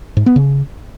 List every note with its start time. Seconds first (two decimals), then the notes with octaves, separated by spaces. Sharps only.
0.17 G#2
0.26 B3
0.36 C#3